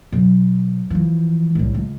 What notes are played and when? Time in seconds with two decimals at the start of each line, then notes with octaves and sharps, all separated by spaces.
0.12 B2 F#3
0.90 E3 F3
1.55 C2 A2
1.74 C#2